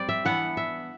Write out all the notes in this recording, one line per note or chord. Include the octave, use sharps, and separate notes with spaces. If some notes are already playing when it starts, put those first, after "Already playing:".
Already playing: G3 C4 C5 D5
E5
E3 B3 D4 F#5
E5